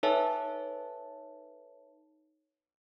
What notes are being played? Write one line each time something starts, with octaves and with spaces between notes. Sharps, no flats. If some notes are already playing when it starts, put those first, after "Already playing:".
D#4 A4 B4 C#5 E5 A5